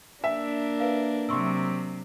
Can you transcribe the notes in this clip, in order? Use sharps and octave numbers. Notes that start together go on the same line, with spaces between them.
A#3 D4 A#4 E5
B4 F5
C3 F#3 C6 C#6 E6